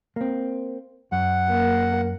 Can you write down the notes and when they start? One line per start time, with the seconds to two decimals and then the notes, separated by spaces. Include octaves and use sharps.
0.16 A#3 C4
1.12 F#2 F#5
1.49 A#3